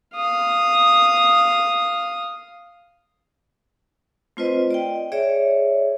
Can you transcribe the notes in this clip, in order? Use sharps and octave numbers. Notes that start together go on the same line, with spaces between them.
F5 D#6
A3 C4 F4 B4 C5 D#5
D5 D#5 G5
G#4 C#5 D5 E5